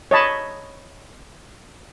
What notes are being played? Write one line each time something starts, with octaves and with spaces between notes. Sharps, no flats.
C#5 D#5 A5 B5